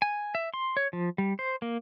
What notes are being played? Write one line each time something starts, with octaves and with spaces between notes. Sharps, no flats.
G#5
E5
C6
C#5
F3
G3
C5
A#3